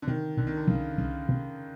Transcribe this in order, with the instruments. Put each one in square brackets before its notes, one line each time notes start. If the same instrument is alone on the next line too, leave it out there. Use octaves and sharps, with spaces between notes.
[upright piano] D3
[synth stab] C3 [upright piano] D#3
[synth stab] C2 [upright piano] D3
[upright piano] D#3
D3
[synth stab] C2 [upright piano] C#3
[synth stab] C2 [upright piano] C#3
[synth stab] C3